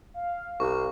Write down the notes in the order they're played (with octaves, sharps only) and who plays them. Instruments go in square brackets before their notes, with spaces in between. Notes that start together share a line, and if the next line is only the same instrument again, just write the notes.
[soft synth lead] F5
[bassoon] C2 [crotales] C#6